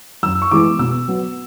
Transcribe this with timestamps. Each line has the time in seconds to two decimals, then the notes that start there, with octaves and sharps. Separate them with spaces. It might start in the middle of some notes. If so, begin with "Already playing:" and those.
0.23 F#2 E6
0.42 C#6
0.51 E3 G#3 B3 D6
0.79 B2 E6
1.08 F#3 B3